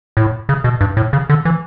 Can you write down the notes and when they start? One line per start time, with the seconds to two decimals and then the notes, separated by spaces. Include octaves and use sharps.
0.17 A2
0.49 C#3
0.64 B2
0.81 G2
0.97 A2
1.13 C#3
1.29 D3
1.45 E3